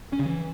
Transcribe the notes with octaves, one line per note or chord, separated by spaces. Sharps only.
C#4
C#3
E3